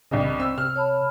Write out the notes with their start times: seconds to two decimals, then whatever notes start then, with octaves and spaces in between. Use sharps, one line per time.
0.11 C2 G2 C#3 D#5
0.40 C4 E6
0.58 C3 F6
0.76 C#5 A5 B5